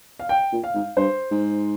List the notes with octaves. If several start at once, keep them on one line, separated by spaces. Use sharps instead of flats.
F5
G5
A#2
F5
G#2
G2 C5
G#2